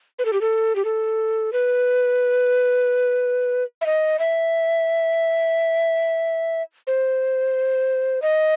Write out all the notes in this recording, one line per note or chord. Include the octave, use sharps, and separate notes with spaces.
B4
A4
G4
A4
G4
A4
B4
E5
D#5
E5
C5
D#5